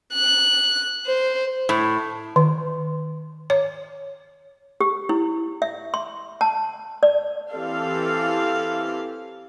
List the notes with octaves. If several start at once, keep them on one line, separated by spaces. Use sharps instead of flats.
F#6
C5
A2
D#3
C#5
G4
E4
E5
C6
A5
D5
E3 C4 G4 A4 F5